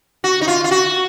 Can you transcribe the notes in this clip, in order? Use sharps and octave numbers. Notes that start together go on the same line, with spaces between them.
F#4
D#4
F4
F4
F#4